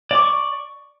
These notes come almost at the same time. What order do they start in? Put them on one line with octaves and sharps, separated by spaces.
D5 D6 C#6